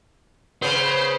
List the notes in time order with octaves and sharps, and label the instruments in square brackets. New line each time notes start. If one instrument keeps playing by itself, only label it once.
[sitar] C#3 B3 [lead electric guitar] C5